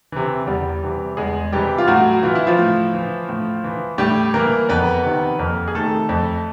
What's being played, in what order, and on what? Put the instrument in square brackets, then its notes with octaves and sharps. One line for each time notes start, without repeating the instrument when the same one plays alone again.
[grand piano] C3 E3
E2 G3 G4
C3 E3
E2 G#3 G#4
C3 E3 G3 G4
F4
A2 F#3 F#4
E3 F4
E4
F3 F4
A2
E3
A2
E3
A2 G3 G4
E3 A#3 A#4
F2 B3 B4
C3 D#3
F2 A#3 A#4
G#4
C3 D#3 A3 A4
F2